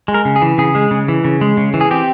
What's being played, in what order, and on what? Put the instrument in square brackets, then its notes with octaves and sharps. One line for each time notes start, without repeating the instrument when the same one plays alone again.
[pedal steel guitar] G#3
A#4
C#3
G#4
E3
C#3 G#4
G#3
C#3
E3
C#3
G#3
C#3
E3
G#4
C4 G4